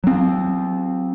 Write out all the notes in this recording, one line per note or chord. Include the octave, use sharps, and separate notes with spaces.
F#3 C4